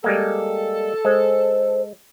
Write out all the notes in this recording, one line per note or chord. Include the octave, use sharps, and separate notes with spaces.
G3 G#3 A#3 A4
G#3 C5